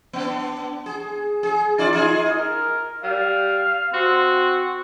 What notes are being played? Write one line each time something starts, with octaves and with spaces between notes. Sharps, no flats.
B3 D4
G#4
G#4
D#4 F4 D5
D#4 F4 G#4
A#4
G3 F5
C4 F#4